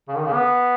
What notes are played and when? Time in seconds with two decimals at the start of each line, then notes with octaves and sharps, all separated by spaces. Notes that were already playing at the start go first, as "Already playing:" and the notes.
0.08 C#3
0.16 D#3
0.25 C#3
0.34 B3